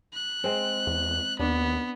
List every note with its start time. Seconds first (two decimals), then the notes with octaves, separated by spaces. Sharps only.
0.14 F#6
0.44 G#3 C4
0.87 E2
1.39 D#2 B3 D4